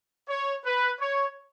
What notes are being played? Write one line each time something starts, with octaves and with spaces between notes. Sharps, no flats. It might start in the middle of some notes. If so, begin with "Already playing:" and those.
C#5
B4
C#5